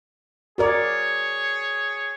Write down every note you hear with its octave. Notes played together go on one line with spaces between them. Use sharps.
F#4 G#4 A#4 C#5 D5